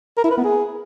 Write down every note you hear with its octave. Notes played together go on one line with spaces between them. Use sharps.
A#4
E4
B4
B3
G#4